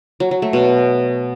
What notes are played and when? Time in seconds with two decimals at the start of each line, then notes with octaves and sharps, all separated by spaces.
0.20 F#3
0.31 F#3
0.42 A3
0.53 B2